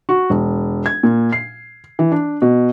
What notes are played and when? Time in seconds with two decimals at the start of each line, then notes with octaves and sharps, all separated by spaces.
0.09 F#4
0.30 E1
0.86 G#6
1.03 A#2
1.32 C7
1.99 E3
2.12 D4
2.42 B2